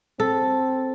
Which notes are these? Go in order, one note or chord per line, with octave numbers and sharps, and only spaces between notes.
C4 A4